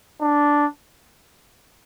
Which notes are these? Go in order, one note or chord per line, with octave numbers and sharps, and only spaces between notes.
D4